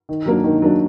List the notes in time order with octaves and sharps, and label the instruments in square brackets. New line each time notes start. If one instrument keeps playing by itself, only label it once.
[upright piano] D#3
F#3 A#3 D4
D#3
F#3 A#3 D4